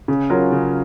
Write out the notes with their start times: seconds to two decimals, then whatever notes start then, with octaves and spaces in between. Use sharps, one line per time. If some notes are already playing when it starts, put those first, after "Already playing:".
0.08 C#3
0.30 F#3 C#4 F4 A#4
0.52 C#3